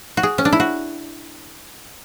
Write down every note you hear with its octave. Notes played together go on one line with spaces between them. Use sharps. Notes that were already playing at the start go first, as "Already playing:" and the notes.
F#4
G#4
C#4
D4
E4
F#4